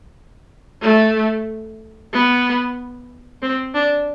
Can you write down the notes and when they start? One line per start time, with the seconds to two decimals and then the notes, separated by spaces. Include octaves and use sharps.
0.82 A3
2.13 B3
3.42 C4
3.75 D4